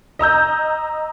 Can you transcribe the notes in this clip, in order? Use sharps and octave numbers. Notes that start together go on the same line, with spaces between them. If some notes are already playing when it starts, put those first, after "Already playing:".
D#5 A#5 E6 G6